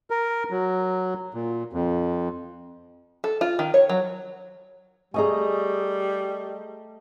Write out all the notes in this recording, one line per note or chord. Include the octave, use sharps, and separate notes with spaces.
A#4
F#3
A#2
F2
A4
F4
D#3
C#5
F#3
G3 A3 G#4 D#5 G#5 A#5